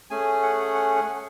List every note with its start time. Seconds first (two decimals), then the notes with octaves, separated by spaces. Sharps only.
0.10 A3 C#4 G#4 G#5
0.43 F#5
0.75 F#5
0.96 F#5